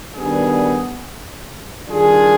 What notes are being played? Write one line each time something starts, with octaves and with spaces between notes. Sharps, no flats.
D#3 G3 B3 D4 G#4
D#3 G3 D4 F4 G#4